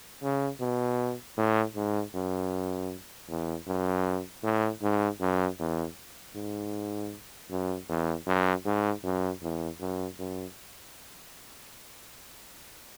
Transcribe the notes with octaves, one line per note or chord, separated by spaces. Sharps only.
C#3
B2
A2
G#2
F#2
E2
F#2
A2
G#2
F#2
E2
G#2
F#2
E2
F#2
G#2
F#2
E2
F#2
F#2